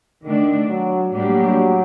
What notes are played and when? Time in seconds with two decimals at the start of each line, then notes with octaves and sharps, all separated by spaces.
0.23 D3 D#3 A3 D4
0.69 F#3
1.14 A2 F#3 G3 A#3 D4 G4